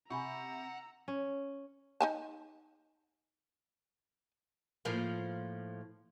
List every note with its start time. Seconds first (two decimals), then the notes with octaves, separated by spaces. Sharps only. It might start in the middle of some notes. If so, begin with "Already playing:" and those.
0.10 C3 F#5 G#5 A#5 B5 C#6 E6
1.08 C#4
2.01 D#4 G#5 A5
4.85 A2 F3 A#3